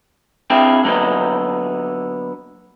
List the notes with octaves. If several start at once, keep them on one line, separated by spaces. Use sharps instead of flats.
C4 D4 E4 G#4 F5 G5
D3 F#3 A#3 B3 D#5